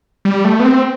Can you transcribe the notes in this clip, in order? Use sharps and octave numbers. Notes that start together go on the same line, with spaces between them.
G3
A3
B3
C4